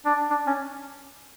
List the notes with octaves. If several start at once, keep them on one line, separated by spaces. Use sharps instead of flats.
D4
D4
C#4